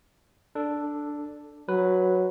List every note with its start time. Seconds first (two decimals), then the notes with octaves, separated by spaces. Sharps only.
0.55 D4 A4
1.69 F#3 B4